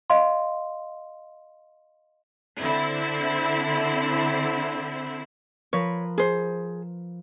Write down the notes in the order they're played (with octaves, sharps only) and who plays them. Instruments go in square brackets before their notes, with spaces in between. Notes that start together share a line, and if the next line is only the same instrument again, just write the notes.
[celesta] D#5 F5 C6
[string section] D3 C4 E4
[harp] F3 A#4 B4 [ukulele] C#5
[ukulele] G#4 C5